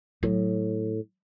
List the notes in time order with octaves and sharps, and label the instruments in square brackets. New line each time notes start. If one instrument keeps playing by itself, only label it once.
[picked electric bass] A2 [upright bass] F#3